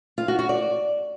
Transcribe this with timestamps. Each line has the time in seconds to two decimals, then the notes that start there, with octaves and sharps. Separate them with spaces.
0.18 F4
0.28 F#4
0.39 F#4
0.49 D5